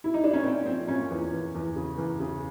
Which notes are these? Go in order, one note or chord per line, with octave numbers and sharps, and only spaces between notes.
E4
D#4
D4
C#4
A#2 C4
F3 C4
A#2 C#4
E2
E2
E2
C#3
E2
C#3